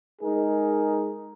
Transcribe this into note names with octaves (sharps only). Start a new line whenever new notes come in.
G#3 D#4 G#4 A#4